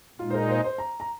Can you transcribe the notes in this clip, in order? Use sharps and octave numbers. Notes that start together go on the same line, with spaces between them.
A#2 G#3 D#4 F4
C5
A#4
C5
D#5
C5
A#5
A#5